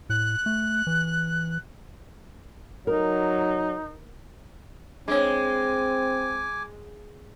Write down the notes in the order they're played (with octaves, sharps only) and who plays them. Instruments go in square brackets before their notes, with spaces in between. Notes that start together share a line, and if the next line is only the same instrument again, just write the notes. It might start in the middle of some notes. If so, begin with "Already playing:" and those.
[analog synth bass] A2 [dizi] F#6
[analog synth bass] A3
E3
[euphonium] F#3 [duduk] D#4 [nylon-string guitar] A#4
[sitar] G#3 [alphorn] C4 [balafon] D4 C#5 [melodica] G#5 D6